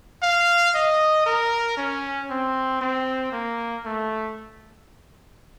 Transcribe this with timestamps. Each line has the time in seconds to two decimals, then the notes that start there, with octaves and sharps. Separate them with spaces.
0.22 F5
0.75 D#5
1.26 A#4
1.77 C#4
2.30 C4
2.81 C4
3.32 A#3
3.85 A3